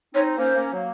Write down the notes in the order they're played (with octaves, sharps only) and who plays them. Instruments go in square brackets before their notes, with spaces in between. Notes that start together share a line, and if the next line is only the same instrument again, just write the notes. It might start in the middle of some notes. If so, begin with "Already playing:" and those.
[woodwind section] C4 D#4 [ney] C#5
[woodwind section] A#3 C#4 [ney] C5
[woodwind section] A#3 C#4
F#3 A#3